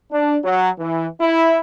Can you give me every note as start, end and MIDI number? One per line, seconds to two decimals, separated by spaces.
0.11 0.37 62
0.43 0.69 54
0.79 1.06 52
1.21 1.59 64